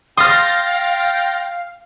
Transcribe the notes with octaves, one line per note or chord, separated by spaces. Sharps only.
F5 G5 C6 D#6 F6 A6 A#6